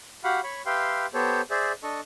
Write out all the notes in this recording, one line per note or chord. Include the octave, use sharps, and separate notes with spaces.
F#4 G4 F5 F#5 B5
C#5 B5 C#6
G4 B4 E5 F5 G5 C6
B3 G4 A4 C5 C#5
G#4 C5 D5 E5
D4 A4 D#5 C#6